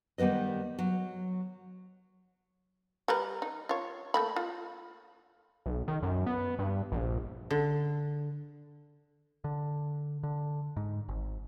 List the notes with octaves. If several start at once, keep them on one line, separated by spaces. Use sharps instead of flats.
D#3 G3 B3 B4 D#5
F#3
G3 A#4 B4
D#4
F4 C#5
A3 A#3 B5
F4
B1
D#3
F#2
B3
G2
A#1
D3
D3
D3
G#2
G#1